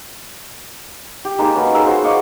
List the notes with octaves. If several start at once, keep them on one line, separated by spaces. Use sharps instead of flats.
G4
G#3 A#3 D#4 A5
C#4 F#4 B4
G#4 A#4 E6
F4 F#4 G#4 C5
D#5 F5 C#6 D6